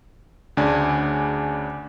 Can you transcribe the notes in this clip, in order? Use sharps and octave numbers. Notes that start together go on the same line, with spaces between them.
D2 C#3 D4 G#5